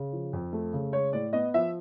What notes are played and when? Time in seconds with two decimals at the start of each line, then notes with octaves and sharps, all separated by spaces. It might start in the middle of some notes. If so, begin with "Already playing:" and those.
Already playing: C#3
0.13 F3
0.33 F2
0.53 A3
0.73 C#3
0.92 G#3 C#5
1.13 A2 D5
1.33 B3 D#5
1.54 F3 E5